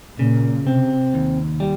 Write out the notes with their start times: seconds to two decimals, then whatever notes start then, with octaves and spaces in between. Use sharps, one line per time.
0.19 A#2 C#3
0.66 C3 C4
1.14 D#2
1.60 G3